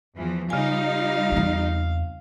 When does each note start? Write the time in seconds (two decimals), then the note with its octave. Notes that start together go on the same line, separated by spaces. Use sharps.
0.16 E2 E3 F3
0.50 C#3 G3 D#4 F4 F5 G#5
1.32 E2 C4